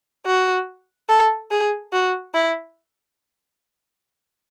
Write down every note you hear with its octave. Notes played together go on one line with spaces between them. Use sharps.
F#4
A4
G#4
F#4
E4